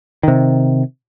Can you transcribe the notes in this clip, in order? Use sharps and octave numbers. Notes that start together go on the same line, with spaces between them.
C3 D#3